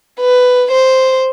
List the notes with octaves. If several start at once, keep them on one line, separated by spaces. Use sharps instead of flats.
B4
C5